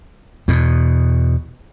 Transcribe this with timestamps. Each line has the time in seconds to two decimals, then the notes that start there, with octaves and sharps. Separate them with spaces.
0.48 E2 B2